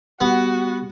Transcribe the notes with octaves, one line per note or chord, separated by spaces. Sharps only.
G3 B3 F#4